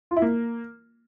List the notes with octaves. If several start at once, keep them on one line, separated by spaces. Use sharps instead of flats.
F4
E4
A#3